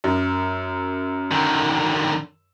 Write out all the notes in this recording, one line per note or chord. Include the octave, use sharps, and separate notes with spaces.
F#2
D3 D#3